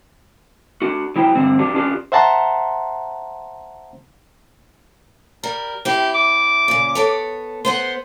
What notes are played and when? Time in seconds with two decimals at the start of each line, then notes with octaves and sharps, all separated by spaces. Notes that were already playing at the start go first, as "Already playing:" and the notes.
0.82 D4 F#4
1.16 F#3 E4 C5 G5
1.35 G2 D3 C4
1.59 D4 F#4 G4 B4
1.74 C#4 D4 F4 G4 B4
2.12 C5 E5 F#5 A5 A#5 C6
5.44 G3 A#4
5.85 C4 E4 G4
6.14 D6
6.68 A#2 C#3
6.95 B3 A4 C#5
7.65 B3 C5 F#5 C6